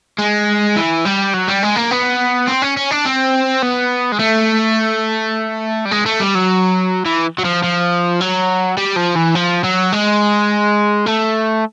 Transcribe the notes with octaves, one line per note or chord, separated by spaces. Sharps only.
G#3
E3
G3
F#3
G3
G#3
A#3
B3
C4
C#4
C#4
D4
C4
B3
G#3
A3
G3
G#3
A3
G3
F#3
E3
F#3
F3
F3
F#3
G3
F3
E3
F3
F#3
G#3
A3